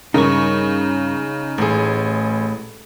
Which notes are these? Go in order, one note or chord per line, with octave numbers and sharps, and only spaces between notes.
G2 C#3 D#4 A#4 C#6
A1 A2 G#4